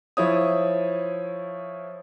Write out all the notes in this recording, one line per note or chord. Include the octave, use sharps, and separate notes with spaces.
F3 E4 C#5 D#6